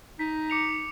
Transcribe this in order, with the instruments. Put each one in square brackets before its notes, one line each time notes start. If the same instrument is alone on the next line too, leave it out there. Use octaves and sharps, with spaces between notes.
[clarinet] D#4 [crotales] B6
[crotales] D6 C#7 F7